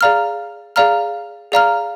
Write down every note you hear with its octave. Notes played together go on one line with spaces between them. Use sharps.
G#4 D5 F5 A#5 F6
G#4 D5 F5 A#5 F6
G#4 D5 F5 A#5 F6